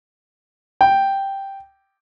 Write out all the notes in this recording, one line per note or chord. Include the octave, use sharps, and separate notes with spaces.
G5